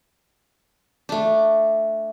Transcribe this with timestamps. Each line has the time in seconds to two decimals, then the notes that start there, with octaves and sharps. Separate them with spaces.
1.09 A3 D4